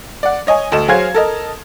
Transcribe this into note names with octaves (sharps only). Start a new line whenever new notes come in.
D5 F#5
C#5 D#5 G#5
D2 A4 D#5 E7
F#3 F#4 G#4 C5 F5 G#6
A4 A#4 D#5